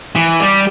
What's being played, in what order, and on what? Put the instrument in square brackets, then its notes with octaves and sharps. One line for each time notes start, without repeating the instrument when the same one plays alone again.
[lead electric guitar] E3
G3